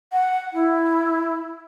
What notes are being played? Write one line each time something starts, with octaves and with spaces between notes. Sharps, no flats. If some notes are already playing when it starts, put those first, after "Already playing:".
F#5
E4